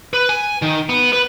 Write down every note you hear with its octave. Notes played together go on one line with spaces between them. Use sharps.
B4
G#5
D#3
B3
B4